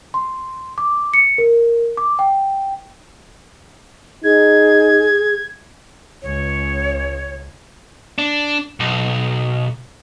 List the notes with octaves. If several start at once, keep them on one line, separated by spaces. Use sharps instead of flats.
C6
D6
C#7
A#4
D6
G5
D#4 G#4 G#6
C#2 C#5
D4
B1